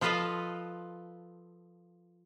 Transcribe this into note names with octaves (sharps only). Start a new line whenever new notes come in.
F3 F4 A4 B4 D#5 F5